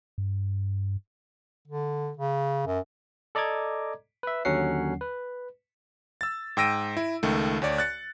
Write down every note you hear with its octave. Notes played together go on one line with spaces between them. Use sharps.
G2
D3
C#3
F#2
A4 D5 D#5 A#5 D6 G#6
B4 E5
D#2 D3 F#3 C#4 F#5 C7
B4
E6 A6
G#2 G5 E6 A#6 D7 D#7
E4
C#2 D#3 A3
D2 C#5 D5
F#6 A6 C#7